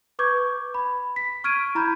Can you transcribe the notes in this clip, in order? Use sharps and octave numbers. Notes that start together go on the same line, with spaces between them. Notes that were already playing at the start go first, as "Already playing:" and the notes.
B4 C#6 D6 G6 G#6
B5
B6
C#6 F6 G#6 D7 D#7
E4 A#5 B5 G6 G#6